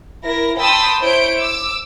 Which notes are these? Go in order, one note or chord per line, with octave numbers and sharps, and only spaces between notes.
E4 A#4 A#6
G5 A5 B5 C6 D#6 E6
E4 C5 C#5 G6 D7
D6 E6